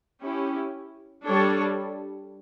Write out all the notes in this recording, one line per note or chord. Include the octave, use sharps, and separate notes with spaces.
C#4 E4 G4
G3 D4 A4 C#5